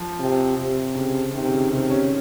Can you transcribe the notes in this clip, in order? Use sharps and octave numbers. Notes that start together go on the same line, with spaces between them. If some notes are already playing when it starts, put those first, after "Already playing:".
Already playing: F3
C3
C3
C#3
C3 D#3
C#3
D#3
C3 D#3
C#4